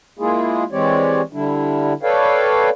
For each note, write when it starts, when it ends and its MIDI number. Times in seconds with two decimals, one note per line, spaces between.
0.19 0.64 56
0.19 0.64 58
0.19 0.64 64
0.19 0.64 65
0.19 0.64 68
0.72 1.22 52
0.72 1.22 56
0.72 1.22 60
0.72 1.22 67
0.72 1.22 73
0.72 1.22 74
1.33 1.93 50
1.33 1.93 55
1.33 1.93 62
1.33 1.93 64
2.03 2.70 69
2.03 2.70 71
2.03 2.70 73
2.03 2.70 74
2.03 2.70 77
2.03 2.70 79